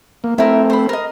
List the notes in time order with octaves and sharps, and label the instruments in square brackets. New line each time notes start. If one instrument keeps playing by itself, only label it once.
[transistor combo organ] A#3
[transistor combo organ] A3 C4 [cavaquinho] E4 A#4
[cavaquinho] C5 B5
A#4 D#5